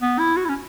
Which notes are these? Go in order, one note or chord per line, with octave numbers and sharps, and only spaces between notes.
B3
E4
F#4
E4
C#4